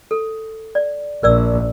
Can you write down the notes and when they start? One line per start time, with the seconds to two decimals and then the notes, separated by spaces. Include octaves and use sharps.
0.11 A4
0.75 D5
1.23 A#1 A#4 D5 E6